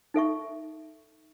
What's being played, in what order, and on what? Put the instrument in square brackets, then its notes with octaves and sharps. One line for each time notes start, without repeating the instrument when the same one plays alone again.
[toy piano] D#4 A4 E5 C#6